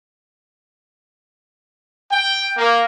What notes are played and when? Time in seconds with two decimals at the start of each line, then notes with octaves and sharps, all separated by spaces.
2.10 G5
2.56 A#3